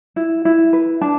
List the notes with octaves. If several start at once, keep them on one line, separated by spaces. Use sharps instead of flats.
E4
E4
B4
D4 A5